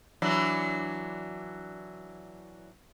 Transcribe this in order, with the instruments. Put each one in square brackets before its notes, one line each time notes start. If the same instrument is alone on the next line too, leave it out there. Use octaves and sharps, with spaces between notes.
[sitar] E3 F#3 D4